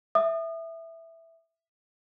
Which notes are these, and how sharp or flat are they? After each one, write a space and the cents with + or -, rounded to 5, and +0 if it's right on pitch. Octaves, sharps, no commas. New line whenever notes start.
E5 +0 D#6 -35